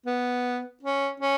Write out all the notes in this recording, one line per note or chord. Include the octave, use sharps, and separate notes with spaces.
B3
C#4
C#4